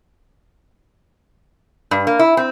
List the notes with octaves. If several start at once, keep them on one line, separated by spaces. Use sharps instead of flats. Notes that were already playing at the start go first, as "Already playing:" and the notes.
G2
A#3
E4
C4